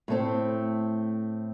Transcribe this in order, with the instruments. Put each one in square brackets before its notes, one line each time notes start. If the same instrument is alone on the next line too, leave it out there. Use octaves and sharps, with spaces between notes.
[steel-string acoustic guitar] A2 A3 C4